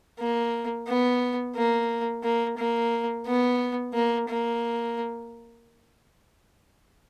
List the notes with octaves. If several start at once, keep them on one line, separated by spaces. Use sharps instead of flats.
A#3
B3
A#3
A#3
A#3
B3
A#3
A#3